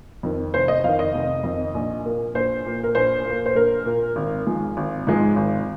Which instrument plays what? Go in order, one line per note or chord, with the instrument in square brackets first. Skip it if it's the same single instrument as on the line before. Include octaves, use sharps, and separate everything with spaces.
[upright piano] F2 D#3
F1 C5
D#5
F2 D#3 F5
D#5
F1
F2 D#3
A#1
A#2 A#3
A#1 C5
A#2 A#3
A#4
A#1 C5
A#2
A#3
C5
A#1 A#4
A#2 A#3
G#1
G#2 F3 G#3
G#1
G#2 F3 G#3
G#1